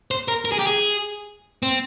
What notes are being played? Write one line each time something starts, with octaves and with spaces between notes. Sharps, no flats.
C5
A#4
A#4
G#4
G4
G#4
C4